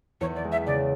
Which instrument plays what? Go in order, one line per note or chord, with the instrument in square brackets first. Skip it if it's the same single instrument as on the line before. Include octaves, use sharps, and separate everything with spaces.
[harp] E2 [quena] C#5
[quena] D5
[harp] G#3
[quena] E5
[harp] C#3 [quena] D5